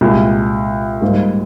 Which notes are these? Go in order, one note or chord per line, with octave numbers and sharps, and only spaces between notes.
C2 A#2 G#3
G#2 G3 A#3